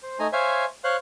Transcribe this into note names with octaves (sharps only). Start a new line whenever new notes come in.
C5
A3 D#4 G#5 A#5
C5 C#5 E5 F5 G#5
C5 C#5 F5 C6 F#6